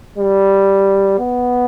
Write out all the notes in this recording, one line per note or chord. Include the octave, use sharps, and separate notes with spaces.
G3
B3